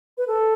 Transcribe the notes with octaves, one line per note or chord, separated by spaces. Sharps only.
B4
A4